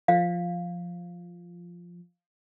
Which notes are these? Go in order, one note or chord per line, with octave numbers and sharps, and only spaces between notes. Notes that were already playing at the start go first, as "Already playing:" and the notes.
F3 F5